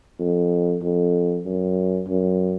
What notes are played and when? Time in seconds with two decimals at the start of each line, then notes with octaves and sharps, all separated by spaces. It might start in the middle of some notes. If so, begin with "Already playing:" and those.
0.20 F2
0.82 F2
1.46 F#2
2.08 F#2